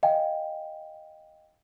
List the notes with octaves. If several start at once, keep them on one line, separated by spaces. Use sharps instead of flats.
D#5 F5 G5 G#5